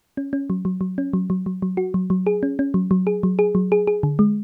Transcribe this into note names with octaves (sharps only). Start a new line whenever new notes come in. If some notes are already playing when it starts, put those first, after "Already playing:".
C#4
C#4
F#3
F#3
F#3
C#4
F#3
F#3
F#3
F#3
F#4
F#3
F#3
G#4
C#4
C#4
F#3
F#3
G#4
F#3
G#4
F#3
G#4
G#4
D3
G#3